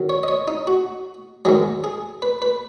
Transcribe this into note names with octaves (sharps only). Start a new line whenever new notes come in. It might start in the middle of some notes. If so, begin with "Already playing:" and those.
Already playing: F#2 D#3 F#3
C#5
D#5
C#5
D#4
F#4
G#2 D#3 F#3 G#4
G#4
B4
B4